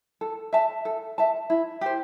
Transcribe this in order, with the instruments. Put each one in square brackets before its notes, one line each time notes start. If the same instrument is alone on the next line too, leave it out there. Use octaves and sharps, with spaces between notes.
[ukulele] A4
E5 A5
A4
E5 A5
E4
G4 C5